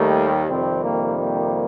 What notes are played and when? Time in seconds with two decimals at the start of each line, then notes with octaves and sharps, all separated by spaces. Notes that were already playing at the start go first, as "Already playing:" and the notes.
Already playing: D#2 D#3 G3 A3
0.47 F2 C3 D#3 G3 C4
0.83 A#3
1.19 A#3